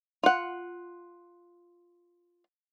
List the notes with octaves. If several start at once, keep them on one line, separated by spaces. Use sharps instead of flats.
F4 F#5